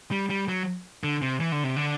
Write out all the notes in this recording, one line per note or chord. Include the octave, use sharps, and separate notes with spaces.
G3
G3
F#3
D3
C3
E3
D3
C3
D3